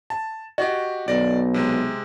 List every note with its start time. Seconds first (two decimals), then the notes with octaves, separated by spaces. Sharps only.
0.10 A5
0.58 F#4 G4 D#5
1.08 B1 D5 A#6
1.54 C3 G#3